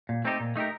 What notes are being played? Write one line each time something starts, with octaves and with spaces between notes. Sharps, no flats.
A#2
A3 C4 D#4 G4
A#2
A3 D#4 G4 A#4